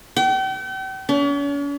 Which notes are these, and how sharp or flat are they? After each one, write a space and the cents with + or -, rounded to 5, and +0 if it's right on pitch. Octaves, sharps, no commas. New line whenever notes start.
G5 -40
C#4 +45